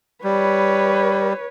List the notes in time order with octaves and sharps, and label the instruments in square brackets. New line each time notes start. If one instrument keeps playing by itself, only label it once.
[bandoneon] G3 [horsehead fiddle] B4 C#5